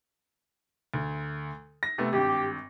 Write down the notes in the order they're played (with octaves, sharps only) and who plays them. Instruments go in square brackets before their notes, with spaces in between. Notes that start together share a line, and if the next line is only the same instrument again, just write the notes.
[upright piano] D2
A#6
C3 A3 B3
[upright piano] G#1 G2 [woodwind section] G4